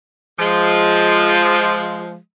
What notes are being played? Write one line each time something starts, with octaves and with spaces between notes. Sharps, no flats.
F3 G#3